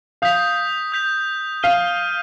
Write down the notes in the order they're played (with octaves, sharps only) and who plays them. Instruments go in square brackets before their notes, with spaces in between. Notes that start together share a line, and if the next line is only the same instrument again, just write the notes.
[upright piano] F5 [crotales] D#6 G6 B6 F7
[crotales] D#6 G6 B6 F7
[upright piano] F5 [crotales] F6 B6 D#7 G7